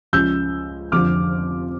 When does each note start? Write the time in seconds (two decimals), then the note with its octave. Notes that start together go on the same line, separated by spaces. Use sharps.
0.13 C#2 C#3 F3 E6 G6
0.92 F1 F2 D3 F3 D6 F6